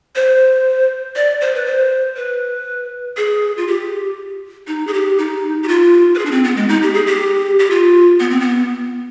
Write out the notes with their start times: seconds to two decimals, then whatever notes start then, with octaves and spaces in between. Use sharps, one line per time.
0.16 C5
1.16 D5
1.41 C5
1.55 B4
1.66 C5
2.16 B4
3.17 G#4
3.57 F4
3.67 G4
4.68 D#4
4.87 G#4
4.93 G4
5.18 D#4
5.63 G4
5.68 F4
6.15 B4
6.19 G#4
6.26 D4
6.31 C4
6.44 B3
6.57 G#3
6.69 D#4
6.83 G4
6.94 G#4
7.07 G4
7.59 G4
7.70 F4
8.20 B3
8.30 C4
8.40 B3